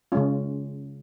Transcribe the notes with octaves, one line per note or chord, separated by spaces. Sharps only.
C#3 G#3 C#4 F4